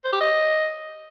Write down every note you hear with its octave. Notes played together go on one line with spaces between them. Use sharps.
C5
G4
D#5